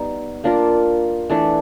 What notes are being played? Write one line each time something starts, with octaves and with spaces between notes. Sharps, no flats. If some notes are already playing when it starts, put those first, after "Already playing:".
Already playing: G3 B3 D#4
A#3 D4 F4 A#4
E3 A3 D4